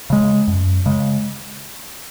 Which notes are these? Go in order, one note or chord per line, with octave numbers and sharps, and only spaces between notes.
C#3 G#3
F#2
C#3 G#3